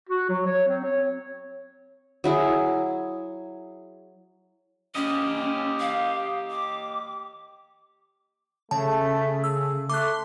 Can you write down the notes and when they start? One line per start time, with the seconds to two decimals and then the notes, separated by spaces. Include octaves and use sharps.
0.09 F#4
0.29 F#3
0.46 C#5
0.67 C4
0.84 C#5
2.24 F#3 E4 G#4
4.95 C#4 G4 D#5
5.80 F5
6.50 D6
8.71 C#3 A3 A5
9.44 E6
9.89 A3 C6 D6 F#6